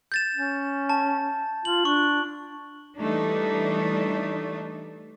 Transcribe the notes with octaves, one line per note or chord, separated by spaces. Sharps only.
G6 A6 E7
C#4
A5
F4 F#7
D4 C#6
E3 G3 A3 D4 D#4